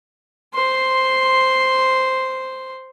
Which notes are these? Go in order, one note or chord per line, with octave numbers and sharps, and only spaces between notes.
C5 C6